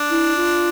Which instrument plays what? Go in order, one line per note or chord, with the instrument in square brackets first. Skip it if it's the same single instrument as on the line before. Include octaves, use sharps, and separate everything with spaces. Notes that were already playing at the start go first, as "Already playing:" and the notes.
Already playing: [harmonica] D4
[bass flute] E4
F4